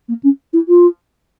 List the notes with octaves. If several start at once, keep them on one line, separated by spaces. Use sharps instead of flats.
A#3
C#4
E4
F4